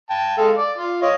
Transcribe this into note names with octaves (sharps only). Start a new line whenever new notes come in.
G5 A5
G#3 A4 F5
D5
F4
C#5 D#5 F5